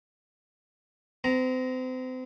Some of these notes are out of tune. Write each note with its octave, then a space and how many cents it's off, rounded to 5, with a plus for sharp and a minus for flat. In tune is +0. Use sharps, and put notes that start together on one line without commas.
C4 -35 A#5 +5